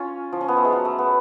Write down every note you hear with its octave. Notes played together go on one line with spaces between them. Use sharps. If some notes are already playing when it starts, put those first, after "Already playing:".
Already playing: C#4 F4
F3
C#4
B3
A3
G#3
F#3
A3
B3